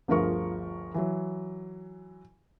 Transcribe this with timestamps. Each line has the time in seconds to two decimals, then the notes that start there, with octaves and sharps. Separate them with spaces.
0.08 G1 D2 F3 G#4 A#4 C#6
0.94 E3 F#3